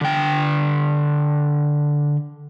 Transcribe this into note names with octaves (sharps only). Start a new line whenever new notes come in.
D3 G5